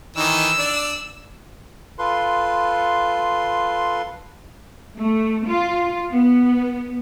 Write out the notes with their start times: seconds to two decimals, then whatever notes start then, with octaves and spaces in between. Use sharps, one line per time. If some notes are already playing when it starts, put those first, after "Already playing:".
0.16 D#3 E3 D#4 E6
0.59 D4 D5
1.99 F4 A4 B4 C6
4.98 A3
5.48 F4
6.11 B3